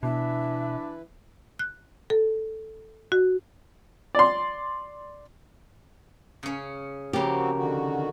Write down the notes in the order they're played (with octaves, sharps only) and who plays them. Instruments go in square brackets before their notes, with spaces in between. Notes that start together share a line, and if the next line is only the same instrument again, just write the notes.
[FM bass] B2 [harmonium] E3 E4 B4 [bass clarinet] D4 [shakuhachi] E5
[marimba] F#6
A4
F#4
[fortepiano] D5 C6
[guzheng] C#3 C#4
[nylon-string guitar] C#3 G4 [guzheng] F3 A#3 [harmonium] C4 F#4
[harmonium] D3 D#3 F#4